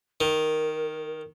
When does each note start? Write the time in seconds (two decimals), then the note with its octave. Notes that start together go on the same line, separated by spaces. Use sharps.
0.21 D#3 A#4